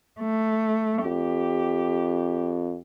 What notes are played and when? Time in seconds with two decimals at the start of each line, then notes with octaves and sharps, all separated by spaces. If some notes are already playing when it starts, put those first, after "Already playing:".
0.20 A3
1.05 F2 G4